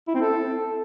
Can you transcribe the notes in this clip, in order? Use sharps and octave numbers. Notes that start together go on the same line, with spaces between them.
E4
C4
A4